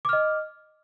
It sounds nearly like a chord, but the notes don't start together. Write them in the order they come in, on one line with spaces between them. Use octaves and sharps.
D6 F6 D#5